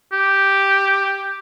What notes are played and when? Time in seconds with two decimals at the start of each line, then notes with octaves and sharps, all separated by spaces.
0.12 G4